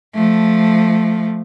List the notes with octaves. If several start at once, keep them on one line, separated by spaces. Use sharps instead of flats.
F3 A3